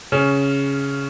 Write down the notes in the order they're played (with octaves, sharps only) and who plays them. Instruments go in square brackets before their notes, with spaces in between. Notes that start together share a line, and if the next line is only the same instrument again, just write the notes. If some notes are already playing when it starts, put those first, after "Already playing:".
[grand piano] C#3 C#4